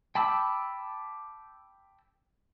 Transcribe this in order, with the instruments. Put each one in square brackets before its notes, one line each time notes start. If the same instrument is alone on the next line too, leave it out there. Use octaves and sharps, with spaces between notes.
[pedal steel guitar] G5 A5 B5 D6 E6